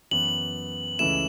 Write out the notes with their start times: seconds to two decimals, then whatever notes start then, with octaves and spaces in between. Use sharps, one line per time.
0.11 F#2 E3 B3 F#7
0.99 C#2 C#3 E3 A3 E4 E7